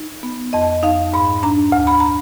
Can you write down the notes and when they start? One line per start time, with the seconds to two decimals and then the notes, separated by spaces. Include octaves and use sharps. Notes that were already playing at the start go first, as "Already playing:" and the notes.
Already playing: D#4
0.23 B3
0.53 F2 D#5
0.83 D#4 F5
1.13 G#2 B5
1.43 D4 A#5
1.72 D2
1.87 B5
2.00 A#5